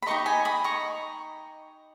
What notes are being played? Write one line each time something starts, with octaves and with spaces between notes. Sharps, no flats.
B5
D#4 G4 B4 D#5 A#5 C#6
G#5 B5
B5 D#6
A#5 C#6